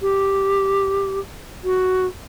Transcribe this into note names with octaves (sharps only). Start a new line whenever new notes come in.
G4
F#4